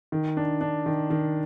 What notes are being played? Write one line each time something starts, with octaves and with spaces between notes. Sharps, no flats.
D#3
D4
D4
D#3
D#3